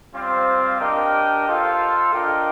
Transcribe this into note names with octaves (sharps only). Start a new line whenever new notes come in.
G3 C4 F4 C5 F5
D4 G4 A#4 D#5 G5
F4 A4 C5 F5
D4 F4 A#4 D#5 G5